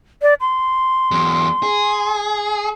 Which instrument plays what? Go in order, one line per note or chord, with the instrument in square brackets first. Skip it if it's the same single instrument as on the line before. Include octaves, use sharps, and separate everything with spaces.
[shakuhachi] D5
C6
[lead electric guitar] E2 F#3
G#4